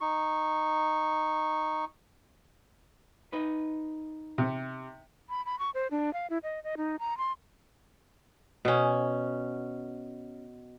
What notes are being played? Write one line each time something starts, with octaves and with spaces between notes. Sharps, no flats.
D#4 C#6
D#4 B4
C3
B5
B5
C#6
C5
D4
F5
E4
D#5
D#5
D#4
A#5
C6
B2 C#4